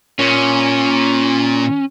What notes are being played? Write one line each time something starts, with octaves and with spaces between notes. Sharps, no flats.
A#2 C#4